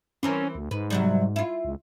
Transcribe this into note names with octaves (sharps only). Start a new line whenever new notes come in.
E3 C4 C#4 A#4
D2
G#2 B4
C3 F#3 G3
E4 F4
C#2